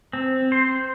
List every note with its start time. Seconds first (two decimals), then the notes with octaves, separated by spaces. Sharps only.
0.13 C4
0.52 C5